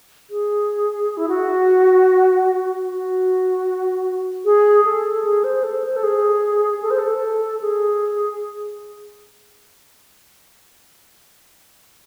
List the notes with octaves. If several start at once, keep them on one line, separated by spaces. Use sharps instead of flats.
G#4
E4
F#4
F#4
G#4
A4
G#4
C5
A4
C5
A4
G#4
A4
C5
A4
G#4